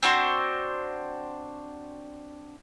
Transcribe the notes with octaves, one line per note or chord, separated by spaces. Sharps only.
C4 D4 F#4 C5